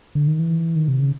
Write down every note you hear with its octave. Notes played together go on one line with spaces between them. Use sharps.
D3
D#3
E3
D#3
C3
C#3